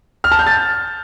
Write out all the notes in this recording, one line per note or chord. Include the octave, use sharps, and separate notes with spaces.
F6
A5
G6
A6